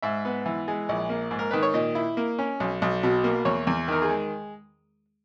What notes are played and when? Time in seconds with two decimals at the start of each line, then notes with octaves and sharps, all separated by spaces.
0.02 G#2 E5
0.25 B3
0.46 E3
0.68 G#3
0.89 A#1
1.10 A#3
1.31 G#2
1.39 A#4
1.51 D#3 B4
1.63 C#5
1.74 A#2 D#5
1.95 E4
2.17 A#3
2.38 C#4
2.60 B1
2.82 B1
3.03 B2
3.24 A#3
3.45 E2 C#5
3.67 E2
3.88 D#3 A#4
4.02 G#4
4.09 G#3